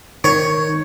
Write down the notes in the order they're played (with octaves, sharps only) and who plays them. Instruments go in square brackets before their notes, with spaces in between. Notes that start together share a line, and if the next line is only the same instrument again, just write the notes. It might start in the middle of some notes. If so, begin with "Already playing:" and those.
[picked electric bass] D#3 [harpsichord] C#5